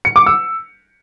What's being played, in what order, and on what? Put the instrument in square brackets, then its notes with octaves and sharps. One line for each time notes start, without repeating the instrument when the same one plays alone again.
[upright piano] C#7
D6
E6